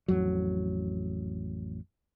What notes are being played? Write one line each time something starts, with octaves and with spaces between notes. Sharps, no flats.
A1 F2 F#3